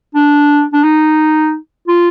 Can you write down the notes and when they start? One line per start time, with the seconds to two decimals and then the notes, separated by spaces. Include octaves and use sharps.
0.15 D4
0.73 D4
0.83 D#4
1.87 F4